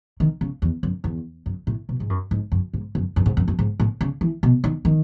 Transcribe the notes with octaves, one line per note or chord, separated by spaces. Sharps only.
D#3
C#3
E2
F#2
E2
F#2
A2
B2
G#2
F#2
G#2
F#2
G#2
F#2
F#2
G#2
F#2
F#2
G#2
A2
C#3
E3
B2
D#3
D#3